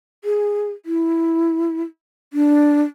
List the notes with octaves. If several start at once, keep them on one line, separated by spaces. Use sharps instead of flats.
G#4
E4
D4